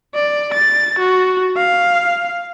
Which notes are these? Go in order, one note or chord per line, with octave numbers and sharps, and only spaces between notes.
D5
A6
F#4
F5